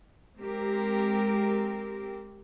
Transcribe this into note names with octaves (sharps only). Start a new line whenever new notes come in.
G#3 C4 G4 A#4